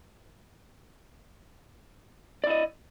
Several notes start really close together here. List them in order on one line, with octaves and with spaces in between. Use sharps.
D5 E4 D#5